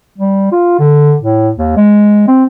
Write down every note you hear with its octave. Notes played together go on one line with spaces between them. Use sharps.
G3
F4
D3
A2
D#2
G#3
C4